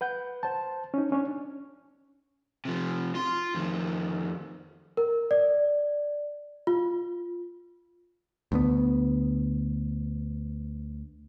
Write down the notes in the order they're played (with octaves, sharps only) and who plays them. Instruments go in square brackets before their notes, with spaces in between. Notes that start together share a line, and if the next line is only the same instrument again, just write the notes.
[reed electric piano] B4 F#5 G6
C5 A5
C#4 D#4
C#4 D4 C#5
[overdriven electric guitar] C3 F3
F4 C6
F2 D#3
[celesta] A#4
D5
F4
[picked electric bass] D2 D3 B3